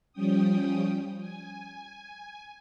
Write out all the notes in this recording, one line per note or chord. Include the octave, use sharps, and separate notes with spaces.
F3 G3 C#4 G5 D#6
G#5